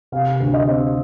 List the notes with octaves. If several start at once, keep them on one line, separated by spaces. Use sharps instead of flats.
C3 F5
D2
D#5
C4